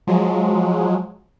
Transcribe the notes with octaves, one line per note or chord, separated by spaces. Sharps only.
F3 F#3 G#3